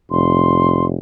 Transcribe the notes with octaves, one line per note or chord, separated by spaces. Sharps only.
F1 C6